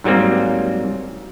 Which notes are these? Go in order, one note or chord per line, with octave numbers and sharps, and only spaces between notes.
G#2 F#3 G3 A#3 C4